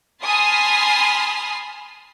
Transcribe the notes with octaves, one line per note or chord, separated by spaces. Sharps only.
G#5 A5 B5 C6 D#6 F6